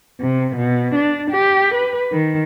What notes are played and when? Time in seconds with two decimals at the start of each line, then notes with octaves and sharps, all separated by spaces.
0.21 C3
0.57 B2
0.95 D4
1.31 G4
1.75 B4
2.12 D#3